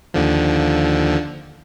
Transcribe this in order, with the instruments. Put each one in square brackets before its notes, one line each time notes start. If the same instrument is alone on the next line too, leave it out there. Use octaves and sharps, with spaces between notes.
[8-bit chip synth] D#2 D3 F3